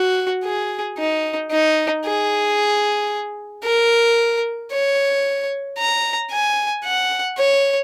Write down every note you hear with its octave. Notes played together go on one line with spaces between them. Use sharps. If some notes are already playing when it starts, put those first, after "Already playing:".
Already playing: F#4
G#4
D#4
D#4
G#4
A#4
C#5
A#5
G#5
F#5
C#5